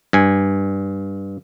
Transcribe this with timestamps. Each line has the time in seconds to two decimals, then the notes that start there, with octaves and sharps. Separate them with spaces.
0.13 G2 G#5